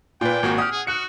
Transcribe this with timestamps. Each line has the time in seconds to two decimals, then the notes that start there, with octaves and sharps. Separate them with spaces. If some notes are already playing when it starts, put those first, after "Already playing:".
0.21 A#2 F4 B4 G5
0.43 G#1 A#3 F#4
0.58 G4 F#5 D#6 F6
0.71 G#4
0.87 F#4 F#6 C#7